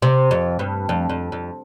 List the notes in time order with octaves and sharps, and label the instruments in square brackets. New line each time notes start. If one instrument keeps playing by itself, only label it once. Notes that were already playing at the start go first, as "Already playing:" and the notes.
[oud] C3
F2
G2
F2
F2
F2